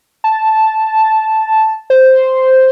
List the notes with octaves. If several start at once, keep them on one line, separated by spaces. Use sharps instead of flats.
A5
C5